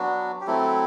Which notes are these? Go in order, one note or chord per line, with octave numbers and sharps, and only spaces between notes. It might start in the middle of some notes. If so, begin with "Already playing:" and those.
Already playing: F#3 B3 D4 F#4
G4
F#3 A3 C4 E4 A4